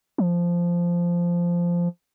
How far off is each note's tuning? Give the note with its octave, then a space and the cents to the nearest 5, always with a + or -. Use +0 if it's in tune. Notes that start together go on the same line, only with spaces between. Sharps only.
F3 -10